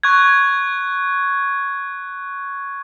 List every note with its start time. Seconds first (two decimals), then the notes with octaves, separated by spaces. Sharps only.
0.03 C#6 F#6 G#6